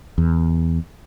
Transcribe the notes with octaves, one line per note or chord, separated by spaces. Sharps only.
E2